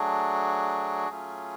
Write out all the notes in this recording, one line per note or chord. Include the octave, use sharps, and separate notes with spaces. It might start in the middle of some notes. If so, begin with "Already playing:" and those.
Already playing: F#3 A3 D4 F#4 G#4
F#3 A3 C#4 F4